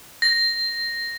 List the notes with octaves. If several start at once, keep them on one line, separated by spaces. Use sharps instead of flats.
A#6